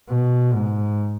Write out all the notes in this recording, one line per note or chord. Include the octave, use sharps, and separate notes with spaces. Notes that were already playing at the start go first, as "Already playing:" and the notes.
B2
G#2